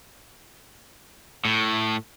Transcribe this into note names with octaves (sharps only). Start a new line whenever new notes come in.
A2